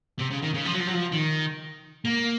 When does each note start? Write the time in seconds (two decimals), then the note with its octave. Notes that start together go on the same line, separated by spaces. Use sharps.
0.19 C3
0.30 C#3
0.42 D#3
0.54 C#3
0.65 F3
0.73 F#3
0.80 F3
0.87 F#3
0.94 F3
1.12 D#3
2.05 A#3